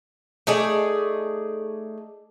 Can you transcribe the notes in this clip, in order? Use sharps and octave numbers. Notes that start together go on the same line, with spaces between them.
A3 D#4 G#4 D5